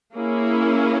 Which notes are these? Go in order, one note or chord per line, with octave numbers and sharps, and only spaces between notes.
A#3 C#4 E4 G#4